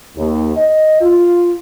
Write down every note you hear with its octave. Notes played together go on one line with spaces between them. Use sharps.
D#2
D#5
F4